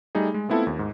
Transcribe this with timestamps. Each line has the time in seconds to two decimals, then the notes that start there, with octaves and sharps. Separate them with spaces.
0.15 G3 A3 D#4 G#4
0.34 G#3
0.49 A3 B3 C4 E4 F4 A4
0.67 D#2
0.79 G#2